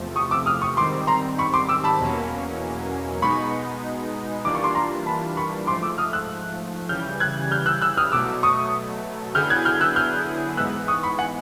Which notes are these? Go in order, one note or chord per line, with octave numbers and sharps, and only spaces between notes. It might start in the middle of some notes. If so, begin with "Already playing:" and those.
Already playing: E2 C3 F3 A3
C#6 D#6
D6 E6
D#6 F6
C#6 D#6
G#2 D#3 G3 C4 C6 D6
A#5 C6
B5 C#6
C6 D6
D6 E6
A5 B5
E2 B2 F#3 A#3 C#4
B2 G#3 B3 D#4 B5 C#6
E3 G3 A#3 D4 F4 D6
C#6
C6 D6
A#5 C6
A5 B5
B5 C#6
G#2 F3 A3 C6 D6
D6 E6
D#6 F6
E6 F#6
C#3 E3 G3 F6 G6
F#6 G#6
F6 G6
E6 F#6
E6 F#6
D#6 F6
B2 F#3 A3 D6 E6
C#6 D#6
D3 F#3 B3 E4 G#4 F6 G6
F#6 G#6
F6 G6
E6 F#6
F6 G6
G#2 E3 G#3 B3 E6 F#6
C#6 D#6
B5 C#6
F#5 G#5